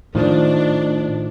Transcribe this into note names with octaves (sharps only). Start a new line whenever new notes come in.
A2 D#3 F3 D4